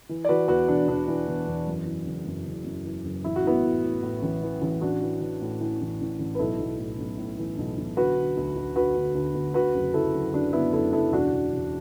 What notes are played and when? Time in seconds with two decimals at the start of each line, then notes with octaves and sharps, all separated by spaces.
0.09 E3
0.25 D5
0.29 E3 F#4 B4
0.48 E2 F#4 B4
0.68 E1 D4
0.88 E1 D4
1.08 E3
1.27 E2
1.47 E2
1.67 F#2
1.86 E3
2.06 F#1
2.26 F#2
2.46 F#1
2.65 F#2
2.85 E3
3.04 F#1
3.24 A1 E4
3.36 F#4
3.45 A2 B3 E4
3.64 A2
3.84 A2
4.03 A2
4.22 A1
4.43 E3
4.62 A1
4.81 A1 D4 F#4
5.02 E3
5.21 E3
5.41 A2
5.61 E3
5.81 A1
6.01 A1
6.19 A1
6.35 B4
6.39 B1 E4 A4
6.60 B1
6.79 A2
6.98 B1
7.18 A2
7.39 E3
7.58 B1
7.78 B1
7.97 D3 F#4 B4
8.17 D3
8.37 D2
8.56 D2
8.76 D3 F#4 B4
8.95 D2
9.15 D2
9.34 D2
9.54 D3 F#4 B4
9.74 F#1
9.94 F#1 E4 A4
10.14 F#1
10.33 F#1 D4 F#4
10.53 F#1 B3 E4
10.72 F#1 E4 A4
10.93 F#1 E4 A4
11.12 E1 D4 F#4
11.33 E1
11.52 E1